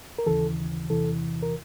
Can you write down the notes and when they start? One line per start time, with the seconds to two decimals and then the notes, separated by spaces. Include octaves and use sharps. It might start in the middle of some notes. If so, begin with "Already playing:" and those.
0.18 A#4
0.26 D#2 C#3 E3 A4
0.90 E2 C3 E3 A4
1.43 A#4